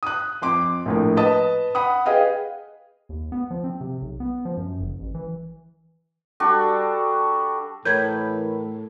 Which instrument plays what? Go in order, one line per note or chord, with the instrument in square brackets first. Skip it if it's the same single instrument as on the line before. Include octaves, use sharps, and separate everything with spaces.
[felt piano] D#6 F#6
F2 C6 D6
A#1 A2 A#4
B4 D#5 A5 D#6
F#5 B5 D#6
G#4 B4 D#5 F5 G5
[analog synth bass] D#2
B3
F3
C4
C3
B1
B3
F3
F#2
F#1
A1
E3
[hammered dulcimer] G3 D4 F#4 A4
[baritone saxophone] A2 [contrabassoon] E3 [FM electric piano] A#4 C#5 B5 [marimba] G6 G#6